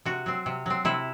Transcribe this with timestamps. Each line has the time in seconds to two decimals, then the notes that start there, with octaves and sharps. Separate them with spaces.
0.05 C3 F#4
0.26 F#3 C4
0.46 C3
0.66 F#3 C4
0.85 C3 E4